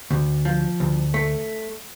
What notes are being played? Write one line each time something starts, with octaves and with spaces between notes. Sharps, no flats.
D2
F3
D2
A3